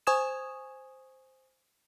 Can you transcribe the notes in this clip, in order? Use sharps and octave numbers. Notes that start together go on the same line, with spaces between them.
C5 G#5 C#6 D#6 G#6 E7